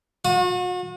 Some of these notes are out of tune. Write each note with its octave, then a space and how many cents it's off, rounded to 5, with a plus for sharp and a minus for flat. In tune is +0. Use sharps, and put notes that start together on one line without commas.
F#4 -40